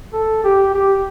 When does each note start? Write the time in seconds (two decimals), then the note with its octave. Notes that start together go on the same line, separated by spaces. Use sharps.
0.13 A4
0.44 G4
0.74 G4